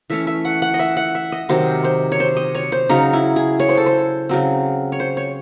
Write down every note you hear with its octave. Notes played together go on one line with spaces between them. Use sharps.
E3 A3 C#4 E5
E5
F#5
F#5
D#5
E5
F#5
E5
D#5
C3 D#3 F#3 C5
C5
C#5
C5
D#5
C#5
C5
C#3 F#3 C#4 D#4
E4
G#4
C#5
C5
A4
C5
C#3 F#3 C4
C#5
C5
C#5